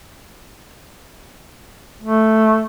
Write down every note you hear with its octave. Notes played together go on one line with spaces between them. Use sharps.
A3